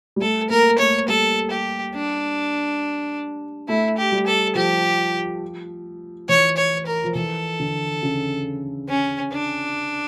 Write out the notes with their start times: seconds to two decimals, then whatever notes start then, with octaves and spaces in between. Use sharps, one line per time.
0.16 G3
0.21 A3 A4
0.50 A#3 A#4
0.78 A3 C#5
1.08 G3 A4
1.51 G4
1.95 D4
3.68 A3 E4
3.98 G4
4.12 G3
4.27 A4
4.55 F3 G4
6.29 E3 C#5
6.57 C#5
6.86 A#4
7.04 F3
7.15 E3 A4
7.60 D3
8.03 C#3
8.89 C#4
9.33 D4